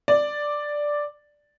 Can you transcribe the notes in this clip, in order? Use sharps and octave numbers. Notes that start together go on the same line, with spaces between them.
D5